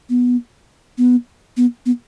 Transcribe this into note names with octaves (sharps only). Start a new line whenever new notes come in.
B3
B3
B3
B3